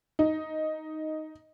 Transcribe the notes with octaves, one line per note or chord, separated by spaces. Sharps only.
D#4